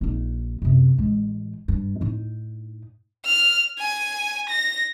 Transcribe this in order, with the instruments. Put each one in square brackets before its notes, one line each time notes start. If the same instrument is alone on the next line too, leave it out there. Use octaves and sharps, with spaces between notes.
[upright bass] A#1 D#4
F#2 C3
A1 G#3
G2
A2 D#4
[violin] F6
G#5
A#6